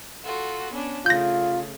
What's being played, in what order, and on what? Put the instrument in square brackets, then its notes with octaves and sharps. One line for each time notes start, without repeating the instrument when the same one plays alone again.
[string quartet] F4 F#4 A4
B3 C#4 D4
[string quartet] C#3 A3 [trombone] F4 [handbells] G6 A#6